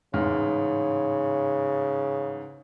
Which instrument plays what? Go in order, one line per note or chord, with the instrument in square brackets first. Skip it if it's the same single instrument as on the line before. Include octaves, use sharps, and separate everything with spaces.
[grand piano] A1 G#2 F6 [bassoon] C#3